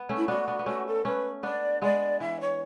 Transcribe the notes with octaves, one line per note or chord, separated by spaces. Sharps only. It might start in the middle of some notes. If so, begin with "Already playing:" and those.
Already playing: B3
A3 C#4
E4
B3 D4 F#4
B3 D4
B3
A3 C#4 F#4
A4
A3 C#4 B4
B3 D4 D5
G#3 B3 D5
E3 E5
C#5